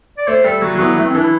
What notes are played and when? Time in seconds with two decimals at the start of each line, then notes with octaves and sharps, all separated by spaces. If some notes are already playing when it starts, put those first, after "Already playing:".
0.18 D5
0.28 A3 C5
0.44 G3 A4
0.62 F#3 F#4
0.75 F#3
0.80 E3 B3
0.96 E3 A3
1.05 C4
1.15 E3 D4
1.24 E4